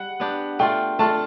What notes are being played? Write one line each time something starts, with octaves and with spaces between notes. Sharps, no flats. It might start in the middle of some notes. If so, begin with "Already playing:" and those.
Already playing: G3 F#5
B3 D4 G4
A3 D4 F4 G5
A3 D4 F4 A5